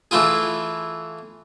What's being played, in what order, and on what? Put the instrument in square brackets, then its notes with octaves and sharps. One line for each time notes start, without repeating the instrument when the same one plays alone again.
[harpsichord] E3 A3 E4 F4 G#4